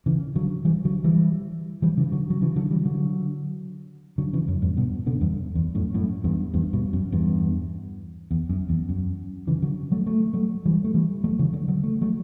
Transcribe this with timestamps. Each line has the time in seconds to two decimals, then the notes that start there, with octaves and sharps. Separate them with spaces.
0.06 C#3 E3
0.35 D3 F#3
0.65 E3 G3
0.85 D3 F#3
1.04 E3 G3
1.82 E3 G3
1.97 C#3 E3
2.12 D3 F#3
2.30 F#3
2.41 C#3 E3
2.56 D3 F#3
2.71 E3 G3
2.85 D3 F#3
4.18 D3 F#3
4.33 C#3 E3
4.48 F#2
4.62 E2 G2
4.77 G2 B2
5.06 B2 D3
5.21 E2 G2
5.55 E2
5.75 F#2 A2
5.94 F#2 A2
6.24 E2 G2
6.54 E2 G2
6.73 G2 B2
6.93 F#2
7.12 E2 G2
8.31 E2
8.49 F#2
8.69 E2
8.89 F#2
9.47 C#3 E3
9.62 D3 F#3
9.92 F#3 A3
10.07 A3
10.33 F#3 A3
10.66 E3 G3
10.84 A3
10.94 E3 G3
11.24 F#3 A3
11.39 C#3 E3
11.53 D3 F#3
11.68 D3 F#3
11.83 A3
12.01 F#3 A3